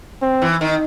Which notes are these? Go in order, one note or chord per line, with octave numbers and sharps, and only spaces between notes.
C4
E3
D#3